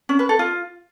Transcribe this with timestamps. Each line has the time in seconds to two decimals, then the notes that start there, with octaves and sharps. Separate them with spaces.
0.09 C#4
0.19 B4
0.29 A4
0.39 F4